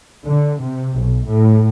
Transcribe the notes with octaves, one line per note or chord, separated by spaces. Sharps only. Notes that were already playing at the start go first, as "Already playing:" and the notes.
D3
C3
B1
A2